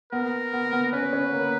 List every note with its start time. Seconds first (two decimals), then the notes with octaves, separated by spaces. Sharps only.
0.12 B3 A#4
0.53 B3
0.73 B3
0.92 C#4 B4
1.13 C#4
1.33 A#3